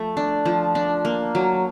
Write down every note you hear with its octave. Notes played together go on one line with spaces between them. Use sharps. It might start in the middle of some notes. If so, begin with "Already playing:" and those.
Already playing: F3 A3
D4
F3
D4
A#3
F#3